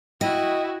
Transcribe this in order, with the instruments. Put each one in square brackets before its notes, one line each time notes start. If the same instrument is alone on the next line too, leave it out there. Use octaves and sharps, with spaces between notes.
[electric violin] E4 F#4 [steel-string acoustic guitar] D#5 [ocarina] G5